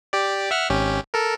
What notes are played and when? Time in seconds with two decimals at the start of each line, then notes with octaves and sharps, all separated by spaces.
0.13 G4 D5
0.51 E5 F#5 F6
0.70 G#1 C#4 G4
1.14 A4 A#4